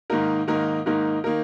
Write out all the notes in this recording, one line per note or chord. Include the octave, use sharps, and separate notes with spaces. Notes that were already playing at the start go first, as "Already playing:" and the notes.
G#2 D#3 A#3 D#4 A#4
G#2 D#3 A#3 D#4 A#4
G#2 D#3 A#3 D#4 A#4
D#3 A#3 D#4 A#4